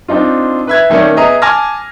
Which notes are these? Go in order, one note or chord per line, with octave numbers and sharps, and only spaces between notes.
C4 D4 D#4 F4
B4 E5 G#6
D#3 A3 A#3 C#4 D5
B3 G#4 D#5 E5 A#5
G#5 A5 D6 F6 G#6 A#6